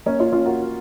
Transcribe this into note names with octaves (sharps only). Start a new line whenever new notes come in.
A#3 C#4
C#4 F4
C#4 F4
F#4 A#4